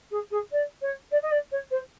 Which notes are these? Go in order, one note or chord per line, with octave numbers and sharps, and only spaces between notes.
G#4
G#4
D5
C#5
D5
D#5
D5
C#5
C5